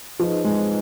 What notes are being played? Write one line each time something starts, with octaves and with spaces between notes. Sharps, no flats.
F3 D#4 G#4 B4 D#5
G#3